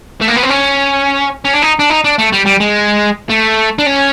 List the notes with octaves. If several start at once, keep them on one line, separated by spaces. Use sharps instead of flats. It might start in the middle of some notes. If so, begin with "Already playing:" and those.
A3
A#3
B3
C4
C#4
C#4
D4
D#4
D4
D#4
D4
A3
G3
G3
G#3
A3
D4
C#4